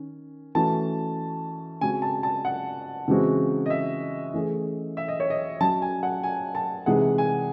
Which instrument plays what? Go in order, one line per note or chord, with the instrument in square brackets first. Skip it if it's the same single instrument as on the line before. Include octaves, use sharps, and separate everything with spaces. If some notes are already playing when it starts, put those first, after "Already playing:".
Already playing: [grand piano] D#3 C#4
[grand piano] E3 A3 C#4 F#4 [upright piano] A5
[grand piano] C#3 G#3 C4 F#4 [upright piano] G#5
[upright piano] A5
A5
F#5
[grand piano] C#3 E3 G#3 C4 F#4
[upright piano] D#5
E5
[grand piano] E3 A3 C#4 G#4
[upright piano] E5
D#5
C#5
D#5
[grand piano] F#3 C#4 F#4 [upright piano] A5
[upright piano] G#5
F#5
G#5
A5
[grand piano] C3 E3 G#3 D#4 G#4 [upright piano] F#5
[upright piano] G#5